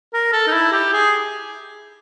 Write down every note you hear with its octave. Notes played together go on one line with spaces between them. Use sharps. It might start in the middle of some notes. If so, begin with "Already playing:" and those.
A#4
A4
D#4
E4
G4
G#4